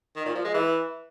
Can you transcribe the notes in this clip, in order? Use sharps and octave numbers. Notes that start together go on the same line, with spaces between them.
D#3
A#2
F3
G#3
E3